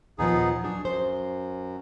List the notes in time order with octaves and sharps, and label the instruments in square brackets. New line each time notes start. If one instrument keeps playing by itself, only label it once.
[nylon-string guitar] D#2 A#2 F3 [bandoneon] B3 D#4 G#4
[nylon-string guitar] F#3 D4 [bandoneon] G#4
[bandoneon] F#2 [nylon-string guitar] C5